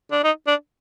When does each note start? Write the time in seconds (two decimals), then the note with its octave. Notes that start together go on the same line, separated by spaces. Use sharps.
0.12 D4
0.24 D#4
0.47 D4